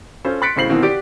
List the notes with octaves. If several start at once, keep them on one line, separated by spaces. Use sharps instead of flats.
C#4 F4 A4 C5
C6 F#6 A6 B6 C#7 D7
B1 A2 C#3 C5 C7 F#7
B2 D#3 E3 C4 F#4
F#4 G4 D5 D7